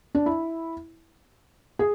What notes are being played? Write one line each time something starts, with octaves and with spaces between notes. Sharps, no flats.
D4
E4
G#4